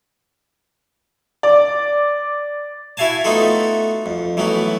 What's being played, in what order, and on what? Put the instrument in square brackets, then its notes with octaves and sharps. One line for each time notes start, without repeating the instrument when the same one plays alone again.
[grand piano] D5
[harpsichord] E4 F#4 E5 F5 G#5 A5
A3 B3 D#4 F4 F#4 A4
F2
E3 F#3 A3 B3 F#4